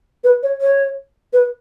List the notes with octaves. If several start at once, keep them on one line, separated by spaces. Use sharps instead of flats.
B4
C#5
C#5
B4